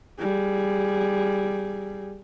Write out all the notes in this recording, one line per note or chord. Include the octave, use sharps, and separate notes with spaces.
G3 G#4